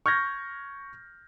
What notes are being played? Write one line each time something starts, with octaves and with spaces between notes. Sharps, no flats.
C#6 F6 G6 G#6 A#6